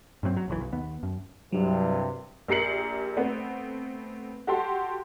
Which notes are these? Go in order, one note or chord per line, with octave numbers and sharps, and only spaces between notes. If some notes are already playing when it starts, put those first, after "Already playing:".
G2 A#2 F#3 C4
F#3
F#1 B1 E3
B1
D#2 B3
F#2
C2 G2 C3 F#3
A#1 G4 A#4 C7 C#7 F#7
A3 B3 C4
F#4 G4 A4 G5 C6